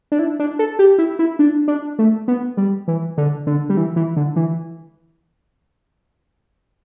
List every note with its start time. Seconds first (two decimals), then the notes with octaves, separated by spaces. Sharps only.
0.12 D4
0.19 E4
0.39 D4
0.59 A4
0.79 G4
0.98 E4
1.19 E4
1.39 D4
1.68 D4
1.99 A3
2.28 B3
2.57 G3
2.88 E3
3.18 D3
3.47 D3
3.70 G3
3.77 E3
3.96 E3
4.17 D3
4.36 E3